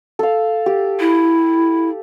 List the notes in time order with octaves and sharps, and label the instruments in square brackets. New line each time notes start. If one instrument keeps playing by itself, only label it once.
[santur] A4 F5
G4
[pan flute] E4